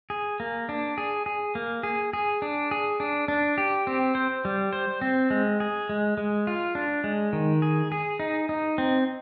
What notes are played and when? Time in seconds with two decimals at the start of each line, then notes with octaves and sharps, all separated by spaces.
0.10 G#4
0.40 A#3
0.69 D4
0.98 G#4
1.26 G#4
1.55 A#3
1.83 G#4
2.13 G#4
2.42 D4
2.71 G#4
3.00 D4
3.28 D4
3.58 G4
3.87 C4
4.15 C5
4.45 G3
4.73 C5
5.01 C4
5.30 G#3
5.60 G#4
5.89 G#3
6.18 G#3
6.47 F4
6.75 D4
7.04 G#3
7.33 D#3
7.62 G#4
7.92 G#4
8.20 D#4
8.49 D#4
8.78 C4